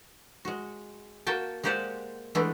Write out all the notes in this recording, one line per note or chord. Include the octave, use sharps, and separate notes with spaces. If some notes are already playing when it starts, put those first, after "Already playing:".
G#3 F#4
A#3 F#4 G5 A5
G#3 A#3 G4 C5 D5 F#5
E3 G#3 A3 B3 D4 E4